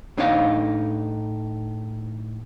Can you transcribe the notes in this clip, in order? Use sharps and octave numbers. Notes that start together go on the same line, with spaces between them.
A2 D4 D#4 C#5 F5